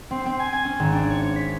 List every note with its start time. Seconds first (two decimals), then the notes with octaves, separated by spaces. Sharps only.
0.11 C4
0.26 C4
0.40 G#5
0.53 G#5
0.65 C#4
0.80 G#1
0.92 D4
1.10 C#5
1.22 C#5
1.36 B6